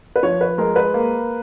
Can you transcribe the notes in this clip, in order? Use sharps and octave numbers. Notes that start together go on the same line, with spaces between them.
B4
F3 C#5
B4
G#3 A#4
B4
A#3